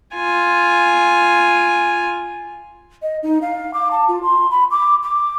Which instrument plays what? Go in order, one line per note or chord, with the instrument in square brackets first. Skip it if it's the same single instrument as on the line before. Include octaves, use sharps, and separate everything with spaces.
[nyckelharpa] F4 G#5
[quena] D#5
D#4
F5
D6
A5
F4
C6
B5
D6
D6